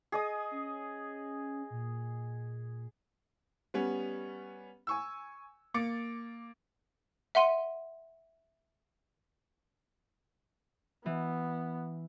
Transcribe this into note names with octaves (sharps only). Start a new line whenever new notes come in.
G#4 D#5 D#6
C#4
A#2
G3 B3 C#4
G#5 C#6 E6
A#3 D6 A6 C#7
E5 F#5 C6 D#7
E3 B3